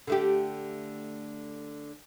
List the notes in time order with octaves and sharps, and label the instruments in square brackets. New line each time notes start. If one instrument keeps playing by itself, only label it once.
[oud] D3 A3 G4